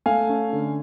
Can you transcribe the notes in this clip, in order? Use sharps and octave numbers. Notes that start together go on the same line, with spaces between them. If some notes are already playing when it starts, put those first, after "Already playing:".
A3 F5 G#5
C#4
D3